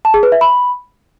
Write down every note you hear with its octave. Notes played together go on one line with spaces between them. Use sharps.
A5
G#4
B4
E5
B5